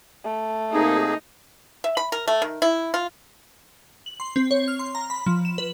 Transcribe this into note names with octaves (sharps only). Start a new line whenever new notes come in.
A3
C3 A#3 D#4 G#4
E5
B5
A#4
A3
D#3
E4
F4
F#7
C6
C4
C#5
F6
C6
A#5
B5
F3
E7
B4